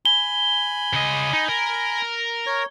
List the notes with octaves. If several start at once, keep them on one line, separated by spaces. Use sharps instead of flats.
G#5 B5 G7
C#3 D#5
D#4
A#4
C#5